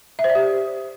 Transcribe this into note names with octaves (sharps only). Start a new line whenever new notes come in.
E5
C5
D5
G4